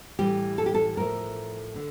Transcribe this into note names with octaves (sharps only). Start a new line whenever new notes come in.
A2 E3 G3 G4
A4
G4
A4
A2 F3 A3 A#4
D3